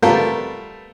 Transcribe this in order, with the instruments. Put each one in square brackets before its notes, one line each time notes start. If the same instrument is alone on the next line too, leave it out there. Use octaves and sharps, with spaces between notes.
[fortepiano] G3 A3 B3 F4 A#4